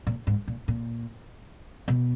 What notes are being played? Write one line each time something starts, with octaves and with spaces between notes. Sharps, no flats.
A#2
G#2
A#2
A#2
B2